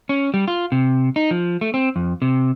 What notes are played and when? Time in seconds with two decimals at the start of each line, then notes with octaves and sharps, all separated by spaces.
0.09 C#4
0.34 G3
0.48 F4
0.72 C3
1.16 D#4
1.31 F3
1.61 A3
1.74 C4
1.96 F2
2.22 C3